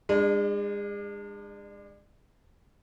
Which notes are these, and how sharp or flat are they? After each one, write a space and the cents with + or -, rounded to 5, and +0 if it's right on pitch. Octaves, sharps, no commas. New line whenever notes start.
G#3 -30 D4 +30